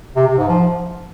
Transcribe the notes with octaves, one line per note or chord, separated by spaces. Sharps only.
C3
C3
G#2
F3